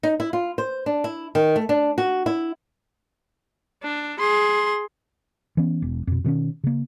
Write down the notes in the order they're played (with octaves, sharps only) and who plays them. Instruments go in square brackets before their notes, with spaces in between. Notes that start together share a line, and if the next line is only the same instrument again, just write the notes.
[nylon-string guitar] D#4
E4
F4
C5
D4
E4
D#3
A3
D4
F#4
E4
[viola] D4
G#4 C6
[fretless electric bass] E3 B3 C#4
E1
F2 B2
B2 D#3 B3 C#4
C#3 A#3